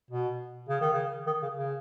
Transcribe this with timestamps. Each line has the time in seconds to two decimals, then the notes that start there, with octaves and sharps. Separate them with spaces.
0.10 B2
0.69 C#3
0.81 D#3
0.93 C#3
1.27 D#3
1.42 C#3
1.57 C#3